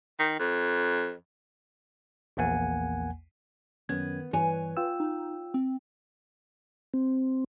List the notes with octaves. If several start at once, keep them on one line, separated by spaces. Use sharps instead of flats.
D#3
F2
A#1 E2 A#3 F#5 G#5
F#2 D#3 B3 C#4 G#6
G2 E3 B4 C#5 G#5
F4 G5 E6
D#4
C4
C4